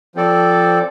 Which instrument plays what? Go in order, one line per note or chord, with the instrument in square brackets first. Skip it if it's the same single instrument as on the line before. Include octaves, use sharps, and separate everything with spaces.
[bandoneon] F3 C4 A4 D5